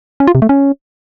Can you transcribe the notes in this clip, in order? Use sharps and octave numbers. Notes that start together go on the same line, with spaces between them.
C#4
F4
C3
A3
C#4